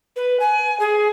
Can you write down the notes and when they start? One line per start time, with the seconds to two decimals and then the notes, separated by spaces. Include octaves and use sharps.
0.16 B4
0.40 G#5
0.80 G#4